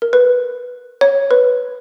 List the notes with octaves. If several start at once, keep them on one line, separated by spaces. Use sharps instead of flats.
A#4
B4
C#5
B4